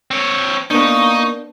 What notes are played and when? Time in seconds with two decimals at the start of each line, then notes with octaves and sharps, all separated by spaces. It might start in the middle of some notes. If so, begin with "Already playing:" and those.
0.11 C4 C#5
0.71 A#3 B3 D4 D#4 C#6